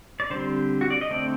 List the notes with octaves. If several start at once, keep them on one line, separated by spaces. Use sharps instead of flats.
D5
D3 G3 C4 C5
F#4
D5
D#5
D3 A3 C4 D5